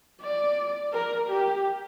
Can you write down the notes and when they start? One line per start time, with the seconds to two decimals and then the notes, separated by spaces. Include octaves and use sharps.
0.21 D5
0.93 A#4
1.29 G4